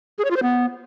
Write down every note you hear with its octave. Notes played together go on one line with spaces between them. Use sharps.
G#4
C#5
F4
C5
B3